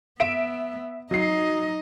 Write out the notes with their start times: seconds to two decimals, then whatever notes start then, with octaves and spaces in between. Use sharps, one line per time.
0.20 B3 E5 D7 E7
1.11 F#3 D#4 D#5 C7